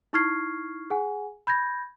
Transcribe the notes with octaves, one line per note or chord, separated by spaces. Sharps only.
D#4 E4 C#6 F6 G#6 C7
G#4 F#5 G#5
B5 G6 G#6 A#6